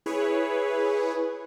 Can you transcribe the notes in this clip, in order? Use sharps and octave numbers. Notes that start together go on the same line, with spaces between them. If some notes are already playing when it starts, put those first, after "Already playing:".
E4 G#4 B4 C#5